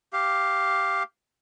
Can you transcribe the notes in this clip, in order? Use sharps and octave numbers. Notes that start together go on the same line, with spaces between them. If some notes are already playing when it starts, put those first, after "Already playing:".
G4 F5